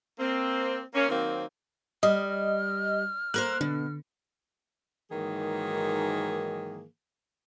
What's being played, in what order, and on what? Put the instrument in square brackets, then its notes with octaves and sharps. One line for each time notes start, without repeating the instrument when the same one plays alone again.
[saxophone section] A#3 C4
A#3 C#4
D#3 F#3 A#3 C4
[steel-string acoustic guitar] G3 [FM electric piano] D#5 [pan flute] F6
[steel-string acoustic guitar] A#3 A#4 C5 [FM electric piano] F#6
[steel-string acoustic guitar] B2 [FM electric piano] D3
[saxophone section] G#2 D#3 E3 F#3 A#3 G#4